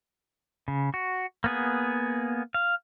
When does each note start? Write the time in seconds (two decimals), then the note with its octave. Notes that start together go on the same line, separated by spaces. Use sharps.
0.68 C#3
0.94 F#4
1.44 A#3 B3 G#4
2.54 F5